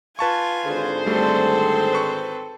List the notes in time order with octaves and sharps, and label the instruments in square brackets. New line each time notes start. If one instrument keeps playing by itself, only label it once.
[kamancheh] F4 G#5 [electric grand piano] B4 A5 C#6
[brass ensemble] G#1 C5 [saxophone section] D3 G#4
[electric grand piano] G3 A3 [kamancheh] C4 A4
[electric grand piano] B4 C#6